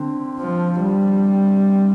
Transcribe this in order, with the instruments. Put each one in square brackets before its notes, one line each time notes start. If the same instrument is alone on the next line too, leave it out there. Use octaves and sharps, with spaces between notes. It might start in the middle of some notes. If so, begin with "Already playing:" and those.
Already playing: [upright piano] D3 C4
[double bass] F3
G3